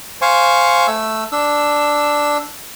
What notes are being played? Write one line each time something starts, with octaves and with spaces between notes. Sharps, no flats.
C5 F5 G#5 C#6
A3 E6
D4 E6